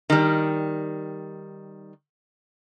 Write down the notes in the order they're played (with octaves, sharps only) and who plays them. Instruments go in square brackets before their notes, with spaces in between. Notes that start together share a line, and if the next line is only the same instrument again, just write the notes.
[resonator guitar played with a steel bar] D#3 G3